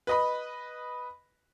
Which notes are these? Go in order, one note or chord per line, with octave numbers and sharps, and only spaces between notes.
B4 D#5 B5